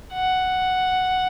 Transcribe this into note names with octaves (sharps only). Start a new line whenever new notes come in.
F#5